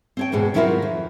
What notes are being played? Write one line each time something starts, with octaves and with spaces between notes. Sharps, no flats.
C4 C#5 G5
E2 G#2 B2 G#4
D#3 F#3 C4 E4 F4 A#4
F2